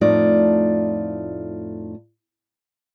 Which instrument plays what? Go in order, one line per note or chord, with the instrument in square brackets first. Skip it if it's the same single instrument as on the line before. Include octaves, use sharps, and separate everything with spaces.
[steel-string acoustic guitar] F2 A2 A3 D#4 F4 D5